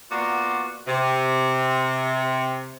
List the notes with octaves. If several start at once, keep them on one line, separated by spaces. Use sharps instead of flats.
A#3 B3 F4 F#4 D5
C3